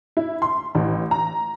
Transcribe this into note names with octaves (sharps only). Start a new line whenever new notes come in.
E4
C6
A1
A#5